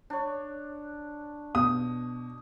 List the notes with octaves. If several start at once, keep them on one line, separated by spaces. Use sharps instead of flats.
D4 C#5
B2 D#6